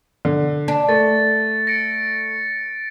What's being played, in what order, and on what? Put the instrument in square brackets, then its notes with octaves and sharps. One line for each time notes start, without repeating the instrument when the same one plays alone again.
[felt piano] D3
[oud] D4
[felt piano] A3 [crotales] A6
[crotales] A#6 C#7 D7